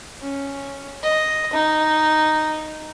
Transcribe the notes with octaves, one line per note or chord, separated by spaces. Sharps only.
C#4
D#5
D#4